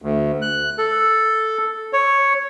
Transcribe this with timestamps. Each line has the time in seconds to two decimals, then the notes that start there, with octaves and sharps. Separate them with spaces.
0.02 D2
0.42 F#6
0.78 A4
1.93 C#5